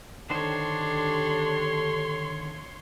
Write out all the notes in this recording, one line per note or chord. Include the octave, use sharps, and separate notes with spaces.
D3 D#3 D4 G4 A4 C5 C#5 C6